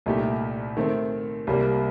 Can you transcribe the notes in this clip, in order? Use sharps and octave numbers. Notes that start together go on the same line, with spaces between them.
C2 A#2 A3 D#4 G4
D#3 A3 C4
C2 C3 G3 A#3